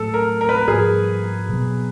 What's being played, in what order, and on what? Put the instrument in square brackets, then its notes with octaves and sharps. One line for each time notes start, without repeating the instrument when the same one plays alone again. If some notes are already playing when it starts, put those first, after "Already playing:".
Already playing: [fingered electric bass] A2 F#3 A3 [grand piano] A4
[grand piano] A#4
A#4
B4
A#4
[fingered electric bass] G#2 F3 A#3 [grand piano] G#4
[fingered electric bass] B2 F#3 B3